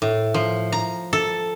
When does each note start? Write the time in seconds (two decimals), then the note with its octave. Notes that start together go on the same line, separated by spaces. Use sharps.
0.02 A2
0.34 F3
0.72 A#5
1.13 A4